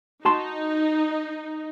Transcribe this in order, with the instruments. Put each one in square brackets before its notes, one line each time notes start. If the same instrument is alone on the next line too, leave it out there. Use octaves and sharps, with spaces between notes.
[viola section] D#4 [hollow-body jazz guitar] F#4 A5 C6